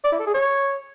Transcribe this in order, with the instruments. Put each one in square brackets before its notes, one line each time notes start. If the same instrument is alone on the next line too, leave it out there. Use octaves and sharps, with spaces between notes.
[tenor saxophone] D5
E4
A4
G#4
C#5